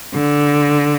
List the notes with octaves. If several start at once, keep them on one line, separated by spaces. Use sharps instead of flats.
D3